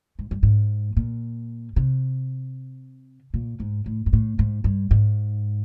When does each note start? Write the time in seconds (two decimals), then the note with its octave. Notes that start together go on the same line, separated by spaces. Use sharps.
0.19 G#2
0.31 G2
0.43 G#2
0.97 A#2
1.76 C3
3.34 A#2
3.60 G#2
3.86 A2
4.06 G#2
4.13 A2
4.39 G#2
4.64 G2
4.91 G#2